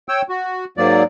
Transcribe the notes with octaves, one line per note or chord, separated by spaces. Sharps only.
C#5 G5 E6
F#4
G#2 F#3 A#3 D5